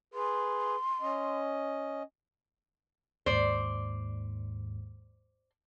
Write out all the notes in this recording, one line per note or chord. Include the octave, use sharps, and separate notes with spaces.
G#4 B4 C6
C#4 D#5
D#2 G#2 C5 D5